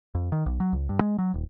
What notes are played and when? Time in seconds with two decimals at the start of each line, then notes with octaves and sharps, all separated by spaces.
0.15 F2
0.32 D#3
0.46 B1
0.60 F#3
0.73 C#2
0.89 G2
1.01 G#3
1.18 F#3
1.34 D#1